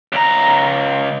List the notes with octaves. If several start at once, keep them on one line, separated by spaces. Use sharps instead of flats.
C#2 A#5